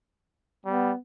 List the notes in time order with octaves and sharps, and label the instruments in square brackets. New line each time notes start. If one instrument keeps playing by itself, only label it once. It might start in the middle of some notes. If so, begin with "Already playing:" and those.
[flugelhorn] G3 [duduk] B3